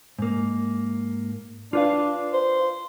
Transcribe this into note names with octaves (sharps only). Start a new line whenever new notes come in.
G#2 A#3
D4 F4 B4 F5
C5